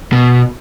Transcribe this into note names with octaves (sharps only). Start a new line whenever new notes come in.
B2